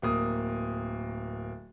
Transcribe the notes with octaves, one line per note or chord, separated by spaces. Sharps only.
D1 A#3 D#6